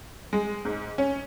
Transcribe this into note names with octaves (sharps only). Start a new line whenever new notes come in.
G#3
G#2
C#4